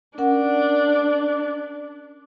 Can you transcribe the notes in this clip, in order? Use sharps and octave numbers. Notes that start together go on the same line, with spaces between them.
C#4 D4 A#4 F#5